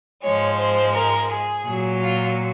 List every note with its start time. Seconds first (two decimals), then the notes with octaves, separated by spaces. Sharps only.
0.24 G#2 F3 G#3 C#5
0.59 C5
0.95 A#4
1.30 G#4
1.66 A#2 F#3
2.02 F4